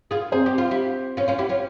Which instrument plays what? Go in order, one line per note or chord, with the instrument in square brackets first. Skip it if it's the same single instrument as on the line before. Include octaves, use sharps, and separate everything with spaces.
[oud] F4 G#4
[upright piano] C4 C5 [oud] G#4
[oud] G4
F4
E4 G4
C#4 F4
C#4 F4
E4 G4
C#4 F4